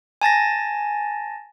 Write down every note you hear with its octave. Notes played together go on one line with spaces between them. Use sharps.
G#5 A5 A6 A#6